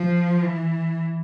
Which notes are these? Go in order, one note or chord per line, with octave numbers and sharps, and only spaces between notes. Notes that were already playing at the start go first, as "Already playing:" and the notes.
Already playing: F3
E3